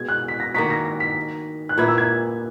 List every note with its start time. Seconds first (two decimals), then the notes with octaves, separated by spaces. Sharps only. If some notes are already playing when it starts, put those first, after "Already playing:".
Already playing: B2 G#3 G#6
0.08 F#6
0.28 B6
0.40 A#6
0.55 D#3 A#3 D#4 F#4 B6
0.70 A#6
0.85 A#6
1.00 B6
1.69 F#6
1.78 A#2 A#3 E4 B4 G#6
1.88 E6
1.98 G#6